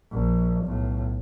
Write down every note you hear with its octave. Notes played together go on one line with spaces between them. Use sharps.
A#1
B1 A2